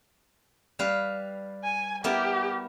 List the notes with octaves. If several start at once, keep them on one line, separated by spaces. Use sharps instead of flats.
G3 B4 F5
G#5
B3 E4 G4 A#4